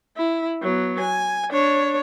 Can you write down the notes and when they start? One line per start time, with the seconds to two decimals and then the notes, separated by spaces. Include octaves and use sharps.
0.17 E4
0.62 F#3 B3
1.00 G#5
1.51 D4 C#5